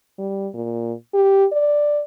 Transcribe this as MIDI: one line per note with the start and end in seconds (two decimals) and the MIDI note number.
0.18 0.48 55
0.54 0.93 46
1.14 1.46 67
1.52 2.02 74